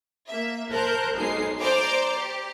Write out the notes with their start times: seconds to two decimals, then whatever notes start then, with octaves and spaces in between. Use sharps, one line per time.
0.28 A#3 E5
0.70 A#4 C5 A5 F#6 G6
1.17 B1 G#3 D#4 C7
1.60 C5 D5 A#5 C6 D6 G6
2.18 G4